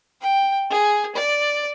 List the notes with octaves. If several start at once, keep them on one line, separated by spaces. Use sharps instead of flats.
G5
G#4
D5